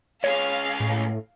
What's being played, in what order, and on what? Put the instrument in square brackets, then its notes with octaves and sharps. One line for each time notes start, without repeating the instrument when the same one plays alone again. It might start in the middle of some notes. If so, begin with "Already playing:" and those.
[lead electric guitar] C#2 G#4 [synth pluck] C#5 [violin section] F5
[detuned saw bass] A2